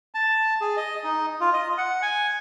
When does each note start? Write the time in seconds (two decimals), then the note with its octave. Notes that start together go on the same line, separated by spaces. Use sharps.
0.15 A5
0.61 G#4
0.77 D#5
1.04 D#4
1.41 F4
1.53 D#5
1.78 F#5
2.02 G#5